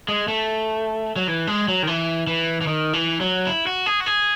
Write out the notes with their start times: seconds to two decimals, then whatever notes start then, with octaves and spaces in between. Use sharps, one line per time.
0.08 G#3
0.28 A3
1.16 F#3
1.28 E3
1.47 G#3
1.68 F#3
1.83 D#3
1.87 E3
2.27 E3
2.61 E3
2.67 D#3
2.93 E3
3.21 F#3
3.47 E4
3.67 F#4
3.86 G#4
4.00 F#4
4.06 G#4